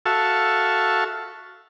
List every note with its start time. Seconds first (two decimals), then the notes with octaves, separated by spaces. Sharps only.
0.06 F#4 A4 E5 F5 A5 C#6